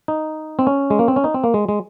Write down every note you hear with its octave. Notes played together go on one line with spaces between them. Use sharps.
D#4
C4
C#4
G#3
A#3
C4
C#4
D#4
C4
A#3
G#3
G#3